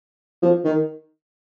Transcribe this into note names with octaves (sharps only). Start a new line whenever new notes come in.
F3
D#3